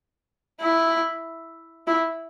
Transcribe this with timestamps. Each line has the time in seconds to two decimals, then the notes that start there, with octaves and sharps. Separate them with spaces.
0.61 E4
1.87 E4